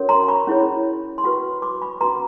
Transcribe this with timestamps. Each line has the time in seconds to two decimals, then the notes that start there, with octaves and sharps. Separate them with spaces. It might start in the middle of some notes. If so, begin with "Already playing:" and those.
Already playing: C#4 F#4 A#4 C#5
0.09 A#5 C6
0.28 B5 C#6
0.47 C#4 E4 G#4 C#5
1.18 C6
1.24 C#4 F#4 B4 B5 C#6
1.62 C6 D6
1.82 B5 C#6
2.01 C#4 F#4 B4 A#5 C6